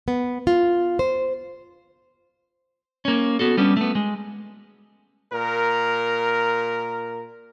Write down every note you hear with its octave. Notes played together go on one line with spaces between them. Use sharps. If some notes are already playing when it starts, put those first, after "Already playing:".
B3
F4
C5
A#3 C#4
B3 F#4 A4
G3 B3 C#4 D4
A3 B3
G#3
A#2 A#4